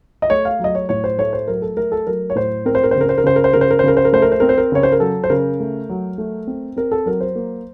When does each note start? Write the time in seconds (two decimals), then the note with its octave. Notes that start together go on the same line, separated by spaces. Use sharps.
0.22 D#5
0.30 A3 C#5
0.45 F5
0.60 F#3 D#5
0.75 C#5
0.89 A2 C#5
1.04 C5
1.18 A3 C#5
1.33 C5
1.48 F#3 A#4
1.62 A4
1.77 A3 A#4
1.92 A4
2.07 F#3 A#4
2.30 C#5
2.35 A2 C5
2.65 C4 A#4
2.75 C5
2.83 A#4
2.91 C5
2.95 C#3
3.01 A#4
3.09 C5
3.18 A#4
3.24 C#3 C5
3.36 A#4
3.44 C5
3.53 C#3 A#4
3.61 C5
3.71 A#4
3.79 C5
3.84 C#3 A#4
3.97 C5
4.05 A#4
4.13 A3 C5
4.22 A#4
4.32 C5
4.40 C4 A#4
4.49 C5
4.58 A#4
4.72 C#3 C#5
4.83 C5
4.92 A#4
5.00 F#3 A4
5.24 C5
5.30 C#3 A#4
5.60 A3
5.89 F#3
6.18 A3
6.47 C4
6.76 C4 A#4
6.92 A4
7.06 F#3 A#4
7.21 C5
7.35 A#3